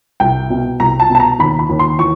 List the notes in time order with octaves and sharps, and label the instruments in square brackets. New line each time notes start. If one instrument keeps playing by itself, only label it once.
[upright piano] C2 G5
B2
C2 A#5
A5
B2
A5
A#5
D#2 B5
B5
D#2
C6
E3 C#6